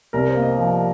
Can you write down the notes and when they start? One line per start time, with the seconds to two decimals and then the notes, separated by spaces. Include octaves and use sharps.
0.13 C2 A#4
0.29 C5
0.35 A#3
0.42 D#5
0.58 F3